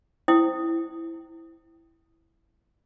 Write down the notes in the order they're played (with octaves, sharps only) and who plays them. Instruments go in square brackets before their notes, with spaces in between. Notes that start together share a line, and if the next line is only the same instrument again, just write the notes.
[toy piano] E4 C5 G5 D#6